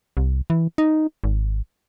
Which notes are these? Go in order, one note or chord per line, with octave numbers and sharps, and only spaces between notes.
C2
E3
D#4
G#1